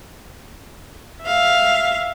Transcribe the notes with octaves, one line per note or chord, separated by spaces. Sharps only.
E5 F5